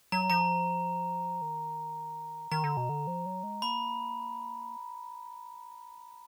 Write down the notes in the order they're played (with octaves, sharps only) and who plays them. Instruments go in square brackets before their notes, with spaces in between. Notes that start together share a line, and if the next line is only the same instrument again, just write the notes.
[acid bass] F#3 [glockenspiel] A#5
[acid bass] F3 [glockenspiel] A#5
[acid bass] D#3
[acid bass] D#3 [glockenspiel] A#5
[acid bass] D3
B2
D3
F3
F#3
G#3
[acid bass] A#3 [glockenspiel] B5